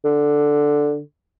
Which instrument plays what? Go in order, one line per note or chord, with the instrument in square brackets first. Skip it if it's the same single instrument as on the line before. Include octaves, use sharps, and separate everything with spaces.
[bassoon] D3